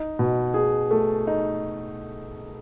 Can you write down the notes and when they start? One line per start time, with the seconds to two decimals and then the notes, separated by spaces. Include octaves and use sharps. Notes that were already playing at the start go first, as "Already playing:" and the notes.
Already playing: D#4
0.19 B2
0.54 G#4
0.91 A3
1.27 D#4